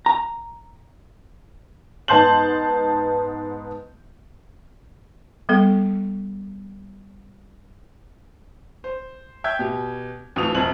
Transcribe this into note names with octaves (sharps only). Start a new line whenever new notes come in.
A#5
G#2 B3 A5 C6 G6 F#7
G3 B3 A4
C5
E5 G5 G6 G#6
B2 G4
D2 E3 F3 D#6 F7
E1 F2 C4 F#7